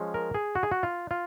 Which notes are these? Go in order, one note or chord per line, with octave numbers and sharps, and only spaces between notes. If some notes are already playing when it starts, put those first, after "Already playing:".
Already playing: F3 G#3 C#4
A#4
G#4
F#4
G#4
F#4
F4
F4